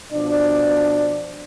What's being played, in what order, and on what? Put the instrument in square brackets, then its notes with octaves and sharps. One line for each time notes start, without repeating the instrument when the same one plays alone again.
[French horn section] B2 F3 D4 D5